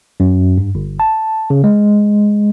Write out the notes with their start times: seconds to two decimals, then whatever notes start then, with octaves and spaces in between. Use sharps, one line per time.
0.20 F#2
0.58 G2
0.75 G1
1.00 A5
1.50 C#3
1.64 G#3